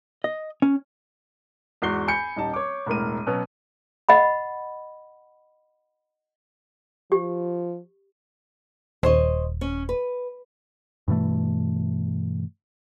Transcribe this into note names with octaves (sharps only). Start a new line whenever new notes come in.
D#5
C#4
E2 G#2 F#4 C7 G7
G#5 B5 G6 C#7
D#1 D#4 G4 A5
C#5 D6
E1 A2 A#4 D#7
B2 F#3 B3 C#4
D#5 F#5 B5
F3 G4
D#1 C5 C#5 D#5
C#4
B4
G2 B2 E3 A3